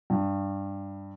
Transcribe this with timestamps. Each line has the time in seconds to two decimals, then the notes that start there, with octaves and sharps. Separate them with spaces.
0.10 G2